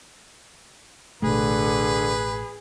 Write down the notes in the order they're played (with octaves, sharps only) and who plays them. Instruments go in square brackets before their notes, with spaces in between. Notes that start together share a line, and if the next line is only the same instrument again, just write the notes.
[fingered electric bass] A1 B2 A3 [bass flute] D3 [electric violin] G#4 [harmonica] B4